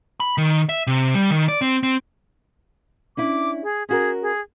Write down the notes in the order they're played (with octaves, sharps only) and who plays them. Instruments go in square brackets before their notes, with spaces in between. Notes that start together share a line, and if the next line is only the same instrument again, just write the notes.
[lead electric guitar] B5
D#3
E5
C3
G3
D#3
D5
C4
C4
[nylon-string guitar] C#4 D4 E4 [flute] D6
[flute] G#4
[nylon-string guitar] C#4 F#4 A#4 [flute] G#4
[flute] G#4